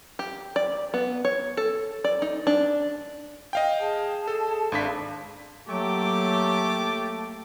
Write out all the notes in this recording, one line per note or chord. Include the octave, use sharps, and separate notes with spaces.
G4
D5
B3
C#5
A4
D5
D#4
D4
D#5 F5 G5
G#4 A5
A4
G#1 D4 F5 B5 C6 B6
F#3 A3 A#3 G4 G5 A5 D6